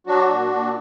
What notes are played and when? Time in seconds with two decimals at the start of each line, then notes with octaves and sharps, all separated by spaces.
0.07 F#3 D4 F#4
0.28 A#2
0.51 A#2